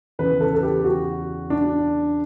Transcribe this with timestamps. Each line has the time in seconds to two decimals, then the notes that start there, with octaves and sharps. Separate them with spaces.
0.19 E2 C#3 E3 B4
0.40 A4
0.54 A4
0.63 G4
0.84 F#4
1.50 D4